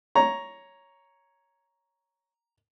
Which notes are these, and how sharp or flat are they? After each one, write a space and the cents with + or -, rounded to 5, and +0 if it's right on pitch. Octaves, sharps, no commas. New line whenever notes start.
C#5 +0 A#5 +5